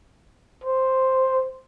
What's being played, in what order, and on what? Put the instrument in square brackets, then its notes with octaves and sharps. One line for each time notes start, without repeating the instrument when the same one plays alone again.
[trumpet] C5